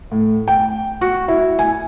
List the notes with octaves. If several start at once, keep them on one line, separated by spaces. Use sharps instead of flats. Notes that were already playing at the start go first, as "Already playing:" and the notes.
A2
G5
F#4
E4
G#5